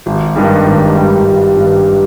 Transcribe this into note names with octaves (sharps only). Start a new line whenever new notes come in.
G#1
G2 D#3 G3
G#1
G2 D#3 G3
G#1
G2 D#3 G3